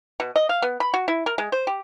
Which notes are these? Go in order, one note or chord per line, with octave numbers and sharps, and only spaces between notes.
B2
D#5
F5
B3
B5
F#4
E4
A#4
G#3
C5
G4